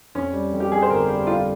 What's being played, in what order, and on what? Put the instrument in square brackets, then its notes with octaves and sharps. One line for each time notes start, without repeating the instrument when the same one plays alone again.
[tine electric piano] F2 [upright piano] C#4
[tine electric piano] G3
F2
[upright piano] G4
[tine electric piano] F2 [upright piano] G#4
[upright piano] C5
[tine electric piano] G1 [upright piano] A#4
[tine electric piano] G3
[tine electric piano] F2 [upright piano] F4